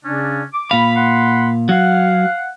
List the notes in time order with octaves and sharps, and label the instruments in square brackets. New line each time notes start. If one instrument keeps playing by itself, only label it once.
[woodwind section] C#3 C#4 D4
D6
[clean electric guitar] A#2 F5 [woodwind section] B5
[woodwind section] F#5 B5 C6
[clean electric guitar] F#3 [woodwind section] F5 F#5